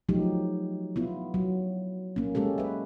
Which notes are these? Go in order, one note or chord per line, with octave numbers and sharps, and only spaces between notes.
F3 F#3 A3 D#4 G4
B3 E4 F4
F#3
A#3 C#4
G#3 C#4 G4 A4
B4 E5